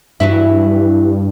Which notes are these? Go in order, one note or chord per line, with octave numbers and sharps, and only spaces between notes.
G2 E3 F#3 E4